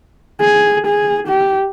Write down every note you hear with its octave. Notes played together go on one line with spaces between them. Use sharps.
G#4
G#4
G4